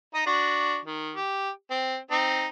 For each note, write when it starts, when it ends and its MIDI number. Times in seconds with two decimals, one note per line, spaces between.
0.14 0.25 63
0.14 0.25 75
0.26 0.79 62
0.26 0.79 66
0.85 1.16 51
1.16 1.50 67
1.71 1.97 60
2.11 2.47 60
2.11 2.47 63